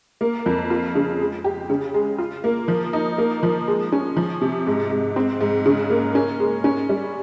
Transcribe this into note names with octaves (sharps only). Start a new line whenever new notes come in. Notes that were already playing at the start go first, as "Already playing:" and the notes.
A#3
F2
F4
C#3
G#3
G4
C#3
G#3
F4
A#3
F3
D#4
A#3
F3
G#3
C#4
F3
C3
G#2
G#2
C4
G#2
C#3
A#3
C#4
G#3
C#4
G3